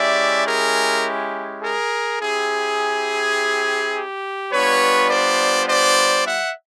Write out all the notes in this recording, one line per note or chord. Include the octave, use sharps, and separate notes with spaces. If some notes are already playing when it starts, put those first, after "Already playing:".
Already playing: G#3 C#4 E4 G4 D5 E5
G#4 A#4
G#4 A#4
C4 E4 G4 G#4
G4
G3 B3 D4 F4 B4 C#5
C5 D5
C5 D5
E5 F#5